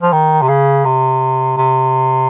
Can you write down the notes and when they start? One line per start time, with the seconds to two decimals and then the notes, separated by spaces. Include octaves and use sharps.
0.02 F3
0.12 D#3
0.42 C3
0.48 C#3
0.85 C3
1.57 C3